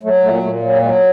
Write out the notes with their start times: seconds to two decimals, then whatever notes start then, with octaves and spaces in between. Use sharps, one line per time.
0.03 F#3 A3
0.23 A#2 A3
0.43 A#2 A3
0.63 F#3
0.82 F#3 G#3